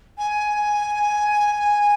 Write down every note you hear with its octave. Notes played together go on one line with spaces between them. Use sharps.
G#5